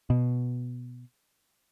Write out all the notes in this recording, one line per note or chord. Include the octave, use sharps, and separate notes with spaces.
B2